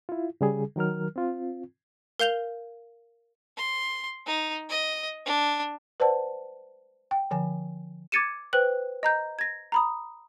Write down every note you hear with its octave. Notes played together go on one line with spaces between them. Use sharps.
E4 F4
C#3 G3 G#4
D#3 F#3 A#4 F6
C4 F4
A#4 F5 G6 F7 G7
C6
D#4
D#5
D4
B4 C5 D5 F#5 A5
G5
D3 F3 G#5
D6 G#6 A6 C#7 D#7 E7
B4 C5 G5 F#6 F#7
D#5 A#5 G6
G#6 A#6
A#5 B5 D#6